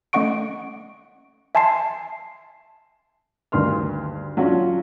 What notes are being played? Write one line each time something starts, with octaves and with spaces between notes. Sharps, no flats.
A3 C#4 D#5 F#5 C#6 D7
E5 G#5 A5 C6 C7
D2 G2 D#3 C6 F6
F#3 C#4 D4 F4 F#4